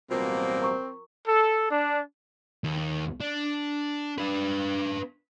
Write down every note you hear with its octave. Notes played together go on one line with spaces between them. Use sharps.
A1 B2 F#3 G3 A#3 C4 F4 C5
A#4 A#5 C#6
A4
D4
D#2
D4
D4 B4